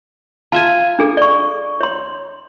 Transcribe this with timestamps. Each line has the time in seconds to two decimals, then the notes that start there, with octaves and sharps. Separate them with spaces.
0.52 F4 E5 G#5 A5
0.99 D4 G#4 A4
1.17 D5 C#6
1.81 C#5 C6